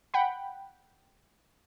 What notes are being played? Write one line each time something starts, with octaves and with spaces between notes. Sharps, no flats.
F#5 G5 B5